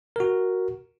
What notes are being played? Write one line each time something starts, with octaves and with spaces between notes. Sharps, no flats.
F#4 A#4